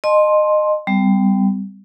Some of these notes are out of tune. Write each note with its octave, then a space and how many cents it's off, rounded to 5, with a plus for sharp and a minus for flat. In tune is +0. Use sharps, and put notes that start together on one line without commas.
D#5 -25 A5 -35 C6 +10
G3 +0 C4 -45